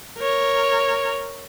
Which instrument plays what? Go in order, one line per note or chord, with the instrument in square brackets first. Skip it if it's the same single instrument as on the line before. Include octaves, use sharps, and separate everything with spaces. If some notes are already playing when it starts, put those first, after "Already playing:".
[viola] A#4 C#5